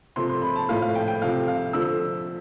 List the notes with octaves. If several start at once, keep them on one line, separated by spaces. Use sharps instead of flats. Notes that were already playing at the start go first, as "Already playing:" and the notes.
C3 F3 A3 C6
C6
B5
A5
A2 F3 A3 F5
F5
G5
G5
C3 F3 A3 F5
F5
D3 F3 A3 E6